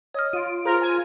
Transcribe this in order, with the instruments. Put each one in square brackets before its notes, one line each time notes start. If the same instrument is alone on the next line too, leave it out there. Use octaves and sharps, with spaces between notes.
[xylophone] C#5 F6 [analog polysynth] D#5
[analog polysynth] F4 D7 [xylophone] D#7
[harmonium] F4 [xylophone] G#4 C5 A#5 [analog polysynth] A#4
[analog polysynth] G#5